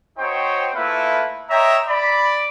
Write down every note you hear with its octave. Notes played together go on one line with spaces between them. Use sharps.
C4 D#4 F#4 C5 C#5 G5
A3 A#3 E4 F4 A4 B4
C#5 D#5 E5 G5 A#5
D5 B5